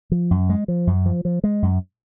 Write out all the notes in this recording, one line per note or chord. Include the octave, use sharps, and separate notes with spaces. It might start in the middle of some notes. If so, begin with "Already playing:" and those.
F3
F#2
G#3
F3
F#2
F3
F3
G#3
F#2